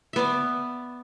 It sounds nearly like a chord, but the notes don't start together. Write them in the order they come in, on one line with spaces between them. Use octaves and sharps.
E5 B3 D5